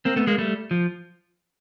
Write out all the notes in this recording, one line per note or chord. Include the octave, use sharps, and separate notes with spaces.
A#3 C4
A3 B3
G#3 A#3
G3 A3
F3